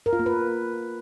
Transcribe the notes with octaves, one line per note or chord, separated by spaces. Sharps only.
A#4
F4
A#3
B4